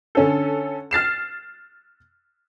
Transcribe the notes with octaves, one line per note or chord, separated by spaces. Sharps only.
D3 C#4 A4
F6 A6 C7 E7